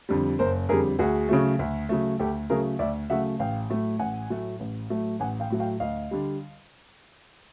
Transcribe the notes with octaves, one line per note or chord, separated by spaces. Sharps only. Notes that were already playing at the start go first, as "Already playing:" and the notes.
F2 D3 G3
F#1 A#4 C5
F2 D3 G3 G#4 A#4
D2 F#4 G#4
C#3 F#3 A3
D2
C#3 F#3 A3
D2 G4 A4
C#3 F#3 A3 G#4 A#4
D2 D5 E5
C#3 F#3 A3 E5 F#5
A1 F5 G5
A2 F#3 A3
A1 F#5 G#5
A2 F#3 A3
A1
A2 F#3 A3
A1 F#5 G#5
F5 G5
A2 F#3 A3
F5 G5
D2 D#5 F5
D3 G3